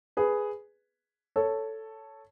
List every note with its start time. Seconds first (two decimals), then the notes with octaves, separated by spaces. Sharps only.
0.17 G#4 B4
1.36 A4 C#5